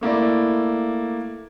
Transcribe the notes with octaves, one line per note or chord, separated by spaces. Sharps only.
A3 A#3 E4 D5